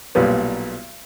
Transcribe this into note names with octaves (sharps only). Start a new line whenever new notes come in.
B1 A#2 G3 B3